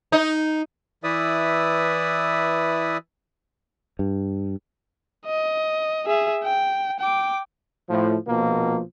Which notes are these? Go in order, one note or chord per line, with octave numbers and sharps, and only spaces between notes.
D#4
E3 E4 B4 D5 E5 D#6
G2
D#5
G#4 E5
G5
G5 D6
A2 F3
A#1 B2 F3 A#3